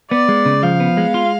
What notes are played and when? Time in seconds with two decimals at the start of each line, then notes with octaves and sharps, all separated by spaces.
0.11 B3 D5
0.29 G#3
0.46 C#3
0.63 F3 F5
0.80 B3
0.97 G#3
1.14 F4